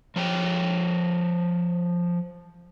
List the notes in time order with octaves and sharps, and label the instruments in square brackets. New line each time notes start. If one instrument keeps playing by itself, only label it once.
[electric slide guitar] F3 C#5 G5